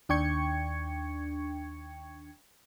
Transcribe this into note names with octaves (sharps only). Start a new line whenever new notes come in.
D#2 D4 G5 C#6 G#6 C#7